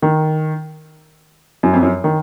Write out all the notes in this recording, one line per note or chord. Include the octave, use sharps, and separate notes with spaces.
D#3
F#2
F2
F#2
D#3